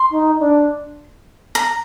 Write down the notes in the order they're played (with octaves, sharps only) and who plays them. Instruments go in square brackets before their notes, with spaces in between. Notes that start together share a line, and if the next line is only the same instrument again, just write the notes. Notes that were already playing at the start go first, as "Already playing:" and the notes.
Already playing: [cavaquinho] C6
[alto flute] D#4
D4
[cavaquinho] A#5